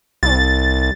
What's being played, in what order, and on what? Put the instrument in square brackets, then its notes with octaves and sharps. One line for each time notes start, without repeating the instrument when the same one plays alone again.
[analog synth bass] C2 [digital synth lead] A6